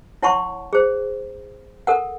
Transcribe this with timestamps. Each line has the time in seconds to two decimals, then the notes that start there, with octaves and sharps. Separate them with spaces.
0.22 E4 C#5 F#5 A5 C6 C#6
0.73 G#4 C5
1.87 A4 A#4 F#5